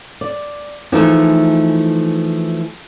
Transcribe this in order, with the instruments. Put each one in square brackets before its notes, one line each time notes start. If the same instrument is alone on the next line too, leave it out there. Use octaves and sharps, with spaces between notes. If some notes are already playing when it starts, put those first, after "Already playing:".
[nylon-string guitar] D5
E3 F3 G#3 A3 D#4